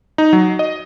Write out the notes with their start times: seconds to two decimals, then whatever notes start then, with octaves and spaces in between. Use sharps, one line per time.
0.18 D#4
0.33 F#3
0.59 D#5